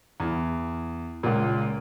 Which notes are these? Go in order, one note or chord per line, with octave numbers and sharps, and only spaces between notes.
E2
C#2 A#2